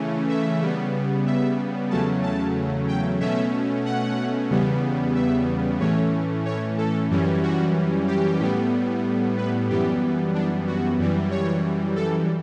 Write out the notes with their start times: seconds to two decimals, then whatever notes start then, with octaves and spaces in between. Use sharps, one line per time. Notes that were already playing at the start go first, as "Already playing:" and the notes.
Already playing: C#3 E3 A3 C#4
0.29 E5
0.61 C#3 G3 B3
1.27 E5
1.90 E2 C#3 F#3 A3 C#4 A5
2.23 A5
2.88 G5
3.20 B2 A3 C#4 E5
3.86 F#5
4.50 E2 C#3 G3 B3
5.15 E5
5.80 A2 E3 A3 C#4 C#5
6.45 C#5
6.78 A4
7.10 F#2 E3 G3 C#4
7.43 F#4
8.08 G4
8.39 A2 G3 B3
9.38 B4
9.70 F#2 E3 G3 B3 G4
10.34 D4
10.67 F#4
10.99 F#2 E3 G3
11.31 C#5
11.96 A4